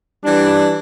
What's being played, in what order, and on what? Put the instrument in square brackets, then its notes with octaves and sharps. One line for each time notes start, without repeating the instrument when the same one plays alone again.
[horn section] E3 G3 D4